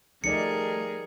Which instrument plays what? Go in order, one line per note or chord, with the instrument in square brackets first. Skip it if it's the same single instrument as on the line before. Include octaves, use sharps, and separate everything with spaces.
[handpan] F3 D#4 D5 [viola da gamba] G3 G#4 A#4 [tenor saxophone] A3 [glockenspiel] C#7